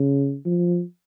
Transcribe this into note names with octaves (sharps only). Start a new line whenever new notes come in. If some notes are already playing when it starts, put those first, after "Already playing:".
Already playing: C#3
F3